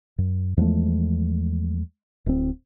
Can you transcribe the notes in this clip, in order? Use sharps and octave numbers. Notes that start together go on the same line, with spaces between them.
F#2
E2 F3 G#3 A3
D1 C4